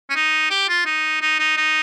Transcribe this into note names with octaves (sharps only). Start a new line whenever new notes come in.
C#4
D#4
G4
F4
D#4
D#4
D#4
D#4